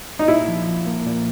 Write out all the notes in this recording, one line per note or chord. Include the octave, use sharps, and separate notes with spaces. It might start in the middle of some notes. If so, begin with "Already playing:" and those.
D#4
A#2 E4
F3
F3
A#3
A#2